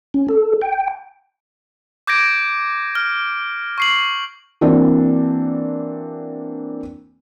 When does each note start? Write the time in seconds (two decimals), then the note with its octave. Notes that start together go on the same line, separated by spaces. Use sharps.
0.14 C#4
0.29 A4
0.61 G5
2.07 D6 G6 G#6 A#6 D7
2.95 F6
3.78 C#6 C7 F#7
4.61 E3 A#3 C4 D4 F#4